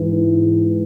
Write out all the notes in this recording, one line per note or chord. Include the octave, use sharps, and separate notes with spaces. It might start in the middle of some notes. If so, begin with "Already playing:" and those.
Already playing: G#2 E3